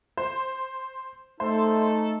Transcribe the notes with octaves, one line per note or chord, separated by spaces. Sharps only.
C5
A3 D#4 A4 C5